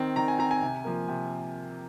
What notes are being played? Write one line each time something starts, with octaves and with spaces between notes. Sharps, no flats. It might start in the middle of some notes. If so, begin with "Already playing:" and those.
Already playing: D#3 C4
D#3 A#5
G#5
C4 A#5
G#5
C3
F3 A#3
C3